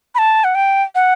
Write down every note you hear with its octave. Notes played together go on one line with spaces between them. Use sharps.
B5
A5
F#5
G5
F#5